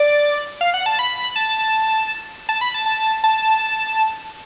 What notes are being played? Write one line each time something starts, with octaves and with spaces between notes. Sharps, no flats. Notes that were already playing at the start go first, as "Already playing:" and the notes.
Already playing: D5
F5
F#5
A5
B5
A5
A5
B5
A5
A5
A5